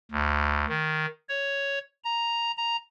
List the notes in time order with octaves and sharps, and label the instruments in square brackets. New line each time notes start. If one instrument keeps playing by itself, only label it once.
[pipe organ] D2
D#3
C#5
A#5
A#5